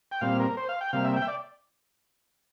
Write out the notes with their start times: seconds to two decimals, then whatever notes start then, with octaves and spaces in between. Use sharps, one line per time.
0.11 G5
0.21 A#2 G3 C4 F5
0.40 A#4
0.57 C5
0.69 F5
0.81 G5
0.93 C3 G3 A#3 F5
1.04 E5
1.16 G5
1.22 E5
1.28 D5